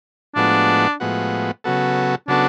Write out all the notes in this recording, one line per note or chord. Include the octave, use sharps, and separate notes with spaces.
A2 F3 G#3 B3 D4 F#4
A2 F3 G#3 B3 F#4
C#3 F#3 B3 F#4 A4
C#3 F#3 B3 D4 F#4 A4